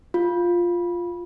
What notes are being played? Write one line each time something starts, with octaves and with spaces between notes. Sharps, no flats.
F4